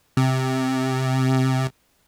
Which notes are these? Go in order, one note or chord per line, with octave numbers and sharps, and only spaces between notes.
C3